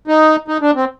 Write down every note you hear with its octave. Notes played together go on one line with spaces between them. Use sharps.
D#4
D#4
D4
C4